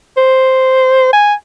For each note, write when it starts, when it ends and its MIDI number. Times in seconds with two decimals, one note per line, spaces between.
0.17 1.12 72
1.13 1.34 80